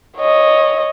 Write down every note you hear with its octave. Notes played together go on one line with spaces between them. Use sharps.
C#5 D#5